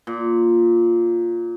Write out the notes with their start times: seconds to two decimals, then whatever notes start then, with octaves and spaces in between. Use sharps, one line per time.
0.07 A#2